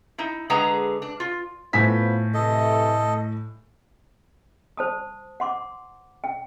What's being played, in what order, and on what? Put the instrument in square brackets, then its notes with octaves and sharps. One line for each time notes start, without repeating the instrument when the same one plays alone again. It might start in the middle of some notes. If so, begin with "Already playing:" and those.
[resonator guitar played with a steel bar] D#4 E4
D3 G#3 G#4 B4 F#5 A#5
D4
F4
[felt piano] A2 G#5 B6 [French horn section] B3 F4 C5
[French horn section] C3 E3 A3 [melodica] A4 D#5
[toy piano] C5 A5 D#6
F#5 C6 D6
G5